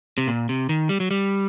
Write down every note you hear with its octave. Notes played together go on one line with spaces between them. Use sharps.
C3
A#2
C3
D#3
G3
F#3
G3